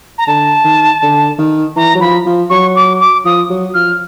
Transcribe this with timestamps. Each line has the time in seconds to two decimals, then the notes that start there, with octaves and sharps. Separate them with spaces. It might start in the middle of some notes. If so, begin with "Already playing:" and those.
0.18 A#5
0.27 D3 A5
0.65 D#3
1.02 D3
1.39 D#3
1.76 E3 A#5
1.95 F#3
2.01 F3 B5
2.26 F3
2.50 F#3 C#6
2.76 D6
3.00 D6
3.25 F3 D#6
3.50 F#3
3.74 F3 F6